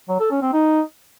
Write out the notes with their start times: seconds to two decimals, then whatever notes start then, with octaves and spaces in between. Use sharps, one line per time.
0.09 F#3
0.20 A4
0.31 C#4
0.42 C4
0.53 D#4